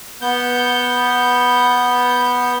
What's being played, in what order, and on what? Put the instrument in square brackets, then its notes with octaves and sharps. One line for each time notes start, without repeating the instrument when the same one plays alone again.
[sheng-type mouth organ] B3 G6